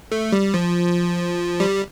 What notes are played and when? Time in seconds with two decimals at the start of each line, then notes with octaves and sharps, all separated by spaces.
0.12 A3
0.32 G3
0.54 F3
1.60 G3